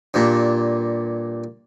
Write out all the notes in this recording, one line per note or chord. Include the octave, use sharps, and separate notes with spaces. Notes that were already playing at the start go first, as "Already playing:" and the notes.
G2 A#2